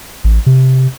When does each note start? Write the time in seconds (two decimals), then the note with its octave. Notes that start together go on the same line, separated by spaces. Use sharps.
0.24 A1
0.46 C3